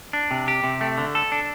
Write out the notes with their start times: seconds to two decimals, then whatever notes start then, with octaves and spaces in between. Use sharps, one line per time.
0.13 D4
0.31 C3
0.48 G4
0.64 C3
0.81 A3
0.98 D3
1.15 A4
1.32 D4